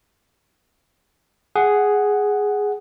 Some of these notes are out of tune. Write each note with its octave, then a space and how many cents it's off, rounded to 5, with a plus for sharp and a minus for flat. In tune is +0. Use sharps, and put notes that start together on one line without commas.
G#4 +0 F#5 +5